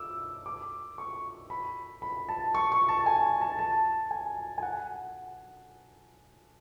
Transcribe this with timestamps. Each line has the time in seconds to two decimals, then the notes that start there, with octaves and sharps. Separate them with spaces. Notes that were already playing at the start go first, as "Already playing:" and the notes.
Already playing: D6 E6
0.46 D6
0.98 C#6
1.50 B5
2.02 B5
2.29 A5
2.55 C#6
2.72 C#6
2.89 A5
3.06 G#5
3.41 A5
3.59 A5
4.11 G#5
4.58 G#5
4.63 F#5